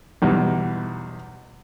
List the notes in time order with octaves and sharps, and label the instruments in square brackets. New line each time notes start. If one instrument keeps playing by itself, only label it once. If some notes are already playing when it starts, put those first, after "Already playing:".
[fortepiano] B1 E2 G3 D#4